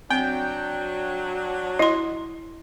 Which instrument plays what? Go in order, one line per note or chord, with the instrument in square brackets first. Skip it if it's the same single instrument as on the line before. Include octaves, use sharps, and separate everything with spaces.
[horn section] F#3 D4 [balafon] C4 [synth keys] G5
[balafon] E4 C6 [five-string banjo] D#5